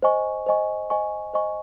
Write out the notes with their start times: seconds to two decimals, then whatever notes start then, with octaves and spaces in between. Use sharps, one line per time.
0.02 C5 D#5 G#5 C#6
0.46 C5 D#5 G#5 C#6
0.90 C5 D#5 G#5 C#6
1.34 C5 D#5 G#5 C#6